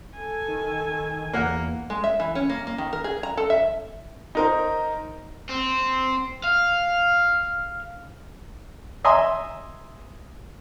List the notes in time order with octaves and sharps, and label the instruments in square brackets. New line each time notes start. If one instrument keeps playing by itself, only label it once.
[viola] A4 G#5
[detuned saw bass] D#3
[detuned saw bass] E2 [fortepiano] A#3 A#4 F#5
[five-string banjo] G#3
E5
E3
C#4
A#3
A#3
D#3
A#4
G#4
A#5
A4
E5
[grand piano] D#4 A#4 C5
[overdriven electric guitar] C4
F5
[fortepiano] D#5 E5 G#5 A#5 C6 D#6